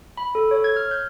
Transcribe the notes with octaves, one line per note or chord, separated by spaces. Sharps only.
B5
A4
C#5
G#6
F6
G6